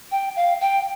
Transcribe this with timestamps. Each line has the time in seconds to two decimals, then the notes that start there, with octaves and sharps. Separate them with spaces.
0.11 G5
0.36 F5
0.61 G5